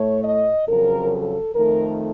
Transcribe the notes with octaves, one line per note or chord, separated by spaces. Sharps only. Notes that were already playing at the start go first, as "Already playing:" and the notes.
Already playing: A2 A3 C#5
D#5
F2 C#3 F#3 A#4
A4
F2 D#3 A3 A#4